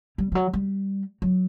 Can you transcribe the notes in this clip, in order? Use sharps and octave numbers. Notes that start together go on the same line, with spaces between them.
G3
F3
F#3
G3
F#3